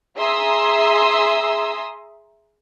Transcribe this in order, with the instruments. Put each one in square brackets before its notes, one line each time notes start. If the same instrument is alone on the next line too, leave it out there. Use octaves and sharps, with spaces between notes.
[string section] G#4 E5 A#5 C6 D#6 E6